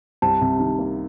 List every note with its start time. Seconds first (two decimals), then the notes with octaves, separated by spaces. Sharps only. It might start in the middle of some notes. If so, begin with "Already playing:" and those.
0.22 C2 A5
0.41 C3
0.60 D#3
0.79 A#3